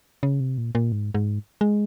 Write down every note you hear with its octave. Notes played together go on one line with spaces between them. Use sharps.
C#3
C3
A#2
A#2
G#2
G#2
G#3